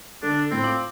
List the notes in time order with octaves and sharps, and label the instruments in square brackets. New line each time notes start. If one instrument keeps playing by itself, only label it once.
[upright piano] D3 [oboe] D4
[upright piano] A2 [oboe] C4
[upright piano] F4 D6 F#7